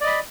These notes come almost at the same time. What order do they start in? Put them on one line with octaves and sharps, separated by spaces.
D5 D#5 B5